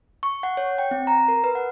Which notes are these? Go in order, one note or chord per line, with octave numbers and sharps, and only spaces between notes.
C#6
F#5
C#5
G5
C4
A#5
A#4
B4
F#5